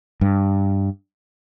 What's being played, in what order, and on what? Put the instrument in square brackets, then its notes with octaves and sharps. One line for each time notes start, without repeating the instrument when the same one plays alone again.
[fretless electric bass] G2